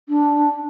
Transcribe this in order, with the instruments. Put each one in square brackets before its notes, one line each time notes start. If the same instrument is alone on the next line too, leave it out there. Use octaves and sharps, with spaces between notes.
[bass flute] D4